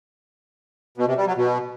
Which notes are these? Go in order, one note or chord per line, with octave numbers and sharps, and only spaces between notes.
B2
C3
G3
F#3
B2